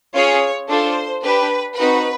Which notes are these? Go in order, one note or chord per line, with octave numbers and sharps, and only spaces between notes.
C#4 F4 G#4 C#5
D4 F4 A4 C5
D4 G4 B4
C4 D#4 F#4 B4